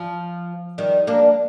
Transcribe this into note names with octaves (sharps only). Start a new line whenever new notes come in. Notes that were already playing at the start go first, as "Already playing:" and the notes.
Already playing: F3
D#3 G3
A#3 D4